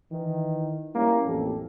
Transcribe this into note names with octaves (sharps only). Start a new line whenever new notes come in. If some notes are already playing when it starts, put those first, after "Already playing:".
D#3 E3
G3 A#3 C#4 E4
A1 F2 G4 A4